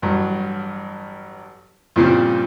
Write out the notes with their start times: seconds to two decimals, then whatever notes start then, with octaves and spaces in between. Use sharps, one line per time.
0.02 A1 G2 F#3
1.96 G2 A#2 C#3 F3 G3 C4